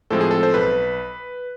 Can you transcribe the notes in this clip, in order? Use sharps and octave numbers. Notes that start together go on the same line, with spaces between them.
A2 F3 G#3 C4 A4
G#4
A4
C5
B1 B4